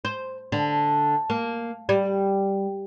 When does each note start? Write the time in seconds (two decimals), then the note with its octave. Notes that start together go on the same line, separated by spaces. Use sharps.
0.05 C5
0.52 D3
1.30 A#3
1.89 G3